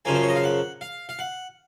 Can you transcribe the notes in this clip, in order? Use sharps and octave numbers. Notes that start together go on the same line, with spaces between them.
F#2 C#3 F3 A#3 G#5
C5
C#5
D#5
F5
F#5
F5
F5
F#5